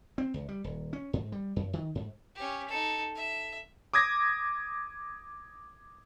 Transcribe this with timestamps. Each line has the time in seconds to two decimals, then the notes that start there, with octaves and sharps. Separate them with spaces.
0.18 C4
0.34 C#2
0.49 G3
0.64 D#1
0.93 C#4
1.13 G#2
1.32 G3
1.56 F#2
1.73 D#3
1.95 G#2
2.35 C#4 G4
2.69 D#4 A4
3.15 E5
3.94 D6 D#6 G#6 A#6